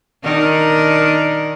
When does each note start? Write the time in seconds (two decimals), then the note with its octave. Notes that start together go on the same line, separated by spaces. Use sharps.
0.24 D#3 D4 A#4